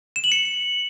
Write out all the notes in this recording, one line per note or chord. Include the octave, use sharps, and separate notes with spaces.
E7
F#7
C#7